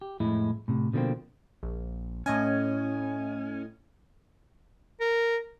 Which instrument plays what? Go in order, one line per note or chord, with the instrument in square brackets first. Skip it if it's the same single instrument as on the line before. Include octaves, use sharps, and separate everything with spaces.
[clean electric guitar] G4
F2 A2 G#3 E4
A2 C3
B2 D3 F3 G#3 A#3 C4
[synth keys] A#1
[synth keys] A2 D#5 G#5 [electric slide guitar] C#4
[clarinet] A#4